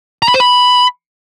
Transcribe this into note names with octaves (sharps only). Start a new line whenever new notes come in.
A#5
B5
C5
B5